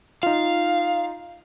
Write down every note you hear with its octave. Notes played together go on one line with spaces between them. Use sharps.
D#4 F4 F5